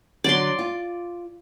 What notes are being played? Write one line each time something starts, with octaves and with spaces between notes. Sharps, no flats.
D3 F#3 D5 C6
F4